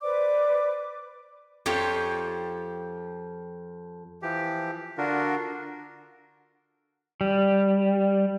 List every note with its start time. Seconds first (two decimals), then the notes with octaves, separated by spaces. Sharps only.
0.03 B4 C5 D5 D6
1.66 F2 F3 G4 C#5
4.22 E3 F3 G4
4.98 D3 D4 F4 F#4 A#4
7.21 G3